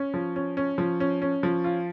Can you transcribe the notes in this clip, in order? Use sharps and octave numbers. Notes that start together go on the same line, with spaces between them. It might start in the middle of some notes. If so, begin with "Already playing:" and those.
Already playing: C#4
F3
C#4
C#4
F3
C#4
C#4
F3
F4